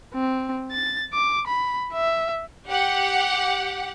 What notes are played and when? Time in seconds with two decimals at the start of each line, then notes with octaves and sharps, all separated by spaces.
0.14 C4
0.72 A6
1.13 D6
1.47 B5
1.94 E5
2.68 G4 F#5